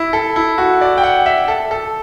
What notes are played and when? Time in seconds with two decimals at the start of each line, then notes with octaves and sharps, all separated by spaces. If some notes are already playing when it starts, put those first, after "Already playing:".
Already playing: E4
0.13 A4
0.36 E4
0.58 F#4
0.81 D5
0.97 G5
1.03 F#5
1.26 E5
1.48 A4
1.71 A4